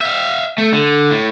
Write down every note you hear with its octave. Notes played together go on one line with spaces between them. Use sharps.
E5 F5
A3
D3
A2